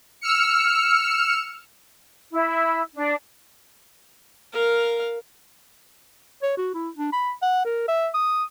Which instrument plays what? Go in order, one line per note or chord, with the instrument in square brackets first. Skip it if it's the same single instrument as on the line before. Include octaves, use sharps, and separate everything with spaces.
[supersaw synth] E6 F6 C#7
[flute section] E4
D4
[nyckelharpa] A#4 F5
[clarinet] C#5
F#4
E4
D4
B5
F#5
A#4
E5
D#6